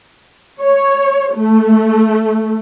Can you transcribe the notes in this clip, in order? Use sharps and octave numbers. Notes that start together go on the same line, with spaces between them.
C#5
A3